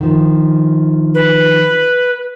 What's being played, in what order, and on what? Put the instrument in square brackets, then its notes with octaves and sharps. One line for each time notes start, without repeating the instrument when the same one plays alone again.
[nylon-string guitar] D#3 F3
[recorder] B4